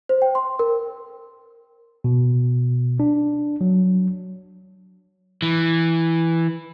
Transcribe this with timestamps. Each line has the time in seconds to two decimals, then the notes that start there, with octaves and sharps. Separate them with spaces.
0.09 C5
0.22 G5
0.35 C6
0.59 A#4
2.04 B2
3.00 D4
3.61 F#3
5.42 E3